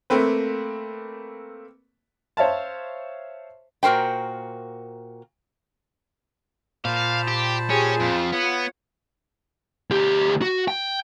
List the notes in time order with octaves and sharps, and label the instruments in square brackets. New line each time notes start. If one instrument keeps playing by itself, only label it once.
[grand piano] A3 A#3 C4 B4
[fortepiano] C5 C#5 E5 F5 A5
[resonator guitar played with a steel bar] A#2 F#4 A#4 C5 G5
[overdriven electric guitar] A#2 [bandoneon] C5 A5 B5 [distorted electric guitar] F5
[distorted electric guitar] G4
[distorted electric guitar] C#4 [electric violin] G4 G#4
[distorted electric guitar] F2 [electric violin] F4
[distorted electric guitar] B3 [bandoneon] C#5 F#5
[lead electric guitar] D2 G4
F#4
G5